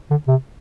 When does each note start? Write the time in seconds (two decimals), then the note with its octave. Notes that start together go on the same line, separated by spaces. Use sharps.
0.10 D3
0.28 C3